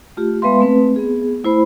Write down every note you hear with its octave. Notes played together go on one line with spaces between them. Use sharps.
A3 F4 G4
G#3 B3 B4 E5 F5 C6
A3 C4 B4
B3 G#4
A3 E4 C5 B5